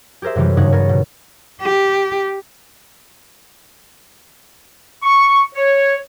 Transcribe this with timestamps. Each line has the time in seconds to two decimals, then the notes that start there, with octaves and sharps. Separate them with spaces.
0.22 G4 G#4 A#4 C5 E5
0.35 F#2 C3 E3 F#3 G3
0.57 G2 C#3 D#4 C#5 F#5
0.72 B3 A#4 C#5
0.89 B2
1.61 G4
5.03 C#6
5.54 C#5